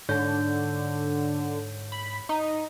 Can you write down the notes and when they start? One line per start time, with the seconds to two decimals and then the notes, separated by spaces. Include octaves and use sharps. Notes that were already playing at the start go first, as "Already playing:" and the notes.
0.09 G#2 D3 C#5 G6
1.92 B5
2.29 D#4